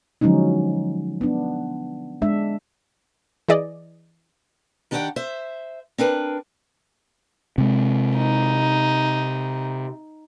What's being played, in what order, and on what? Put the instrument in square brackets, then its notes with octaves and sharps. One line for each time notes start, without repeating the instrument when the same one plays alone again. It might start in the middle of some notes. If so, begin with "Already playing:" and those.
[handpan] D3 F3 F#3 G#3 C#4 D#4
B3 D4
G#3 D4 E5
[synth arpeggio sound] E3 G#4 D5 D#5
[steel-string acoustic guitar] D#3 D4 G4 A#4 F#5 G5
C5 E5
C4 D4 A#4 B4
[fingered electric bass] C3 G#3
[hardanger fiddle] D#4